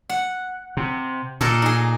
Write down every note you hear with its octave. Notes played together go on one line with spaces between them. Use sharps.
F#5
C3
A#2 A4 A#4 D#5
D#4 G#4